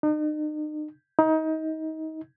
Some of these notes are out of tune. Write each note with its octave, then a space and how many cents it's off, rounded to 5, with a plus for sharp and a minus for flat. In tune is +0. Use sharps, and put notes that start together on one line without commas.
D#4 -40
D#4 +25